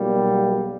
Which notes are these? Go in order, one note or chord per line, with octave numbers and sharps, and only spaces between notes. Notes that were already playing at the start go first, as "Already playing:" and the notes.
Already playing: B1 B2 G3 A#3